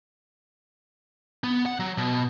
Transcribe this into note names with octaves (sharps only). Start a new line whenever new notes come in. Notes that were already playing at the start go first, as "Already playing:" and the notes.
B3
F#5
F#3
B2